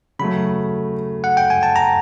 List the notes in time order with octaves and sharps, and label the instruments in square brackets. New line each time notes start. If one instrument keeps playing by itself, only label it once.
[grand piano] C#3 F#3 A3 [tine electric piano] B5
[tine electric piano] F#5
G5
G#5
A5
A#5